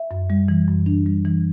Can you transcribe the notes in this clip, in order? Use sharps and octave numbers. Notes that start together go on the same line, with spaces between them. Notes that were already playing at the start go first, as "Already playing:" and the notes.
Already playing: E5
F#2
G3
E3
F#2
D4
G3
E3